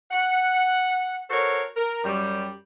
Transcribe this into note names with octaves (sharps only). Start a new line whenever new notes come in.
F#5
F#4 A4 A#4 C5 C#5
A#4
F#2 G3